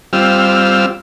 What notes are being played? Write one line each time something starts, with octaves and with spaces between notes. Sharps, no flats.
G3 C4 F4 E6 F6